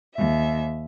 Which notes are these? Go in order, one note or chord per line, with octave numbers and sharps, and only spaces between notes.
D#2 E5